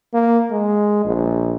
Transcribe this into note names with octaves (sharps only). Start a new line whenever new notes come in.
A#3
G#3
A#1